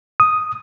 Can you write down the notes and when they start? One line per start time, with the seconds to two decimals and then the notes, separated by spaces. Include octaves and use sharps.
0.20 D#6